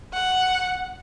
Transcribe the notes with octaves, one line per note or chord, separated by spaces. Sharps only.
F#5